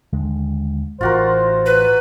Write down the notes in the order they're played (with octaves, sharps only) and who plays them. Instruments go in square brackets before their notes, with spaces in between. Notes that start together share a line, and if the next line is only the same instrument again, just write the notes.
[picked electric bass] D#2 D3 G#3
[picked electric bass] A1 E3 [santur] F4 F#4 A#4 [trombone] C5
[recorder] B4